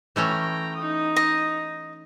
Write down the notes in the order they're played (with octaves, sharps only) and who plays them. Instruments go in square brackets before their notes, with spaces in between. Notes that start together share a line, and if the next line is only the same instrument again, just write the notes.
[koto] E3 A3 C#4 [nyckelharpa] G5 A#5
[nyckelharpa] D#4 D#6
[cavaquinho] D#5